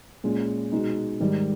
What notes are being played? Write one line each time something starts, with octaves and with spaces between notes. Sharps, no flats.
A#2 G#3 C#4
B2 G#3 D#4
G#2 D#3 G3